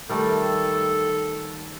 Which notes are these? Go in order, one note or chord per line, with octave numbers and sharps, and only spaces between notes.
D#3 G3 A3 A4